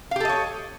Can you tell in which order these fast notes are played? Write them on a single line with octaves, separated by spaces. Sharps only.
F5 G4 A4 D#5 C#5